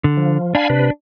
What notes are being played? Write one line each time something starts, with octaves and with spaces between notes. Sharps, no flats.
D3
F3
D4 F5 G#5 B5
C3 B4